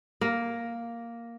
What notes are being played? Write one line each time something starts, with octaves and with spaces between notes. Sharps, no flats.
A#3